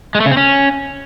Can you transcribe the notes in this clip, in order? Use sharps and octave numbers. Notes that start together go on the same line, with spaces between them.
G#3
A3
C#3
C4
C#4